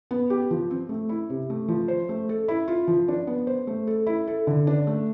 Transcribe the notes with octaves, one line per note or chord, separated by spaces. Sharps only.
B3
G4
F3
C4
A3
E4
C3
A3
F3
C5
A3
A4
E4
F4
F3
D4
B3
C5
A3
A4
E4
A4
D3
D4
A3